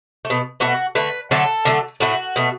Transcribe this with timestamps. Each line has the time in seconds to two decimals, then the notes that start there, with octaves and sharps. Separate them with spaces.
0.25 A3
0.30 B2
0.60 B2 A3 F#4
0.95 D3 A3 B4
1.31 D3 F#3 A3 A4
1.65 D3 F#3 A3
2.00 A2 A3 F#4
2.36 B2 A3